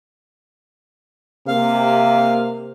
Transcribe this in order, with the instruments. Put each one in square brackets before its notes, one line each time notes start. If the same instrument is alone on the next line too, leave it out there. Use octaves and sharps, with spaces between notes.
[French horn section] C3 A#3 [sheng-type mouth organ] F5